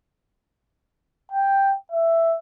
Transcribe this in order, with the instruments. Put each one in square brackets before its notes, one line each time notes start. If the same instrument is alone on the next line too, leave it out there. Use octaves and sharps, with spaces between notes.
[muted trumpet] G5
E5